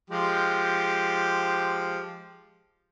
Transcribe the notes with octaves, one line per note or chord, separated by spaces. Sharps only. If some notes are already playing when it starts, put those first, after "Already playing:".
F3 G#3 G4